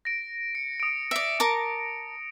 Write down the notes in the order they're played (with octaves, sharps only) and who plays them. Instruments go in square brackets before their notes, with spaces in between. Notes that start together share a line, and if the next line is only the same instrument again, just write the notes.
[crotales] A#6 D7
C#7
D#6 D7
[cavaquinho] D5 E5
A#4 A5 D6